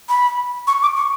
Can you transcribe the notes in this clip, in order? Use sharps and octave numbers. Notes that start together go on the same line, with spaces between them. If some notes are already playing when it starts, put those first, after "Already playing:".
B5
C#6
D6
C#6